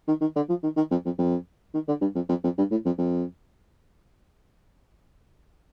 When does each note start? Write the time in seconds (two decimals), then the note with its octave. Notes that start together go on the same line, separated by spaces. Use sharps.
0.08 D#3
0.21 D#3
0.36 D3
0.49 F3
0.63 D#3
0.77 D#3
0.91 F2
1.05 F2
1.18 F2
1.74 D#3
1.88 D3
2.01 G2
2.15 F2
2.29 F2
2.44 F2
2.58 G2
2.71 A2
2.85 F2
2.98 F2